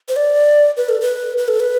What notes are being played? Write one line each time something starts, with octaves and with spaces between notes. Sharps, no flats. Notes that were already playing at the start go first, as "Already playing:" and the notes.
C5
D5
B4
A4
B4
B4
A4
B4